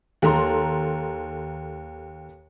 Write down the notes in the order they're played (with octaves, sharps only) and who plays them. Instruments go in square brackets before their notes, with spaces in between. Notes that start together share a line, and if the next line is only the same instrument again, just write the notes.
[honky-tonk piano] D#2 A4 A#5 C6